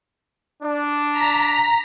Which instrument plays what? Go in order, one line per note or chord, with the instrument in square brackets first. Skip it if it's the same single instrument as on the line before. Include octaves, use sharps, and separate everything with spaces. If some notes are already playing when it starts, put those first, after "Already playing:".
[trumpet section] D4
[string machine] A#5 B6